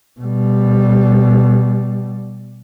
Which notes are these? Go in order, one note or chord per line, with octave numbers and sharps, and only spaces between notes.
B2 G3